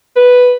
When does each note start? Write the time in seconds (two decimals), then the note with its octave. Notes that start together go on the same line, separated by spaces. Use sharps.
0.16 B4